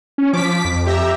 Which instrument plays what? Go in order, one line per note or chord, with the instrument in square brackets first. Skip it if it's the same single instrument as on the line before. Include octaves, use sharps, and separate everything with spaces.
[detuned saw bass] C#4
[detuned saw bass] F3 [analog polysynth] D6 B6
[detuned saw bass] F2
[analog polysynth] G4 E5 A#5